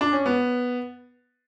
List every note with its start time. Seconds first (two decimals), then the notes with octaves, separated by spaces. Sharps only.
0.01 D4
0.13 C#4
0.26 B3